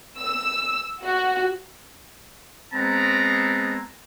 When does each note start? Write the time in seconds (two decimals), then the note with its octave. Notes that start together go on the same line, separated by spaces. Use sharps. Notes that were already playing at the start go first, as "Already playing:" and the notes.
0.19 E6
1.03 F#4
2.74 G#3 B3 C4 A5 A#5